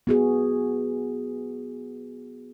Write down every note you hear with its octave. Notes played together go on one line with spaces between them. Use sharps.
B3 F#4 G#4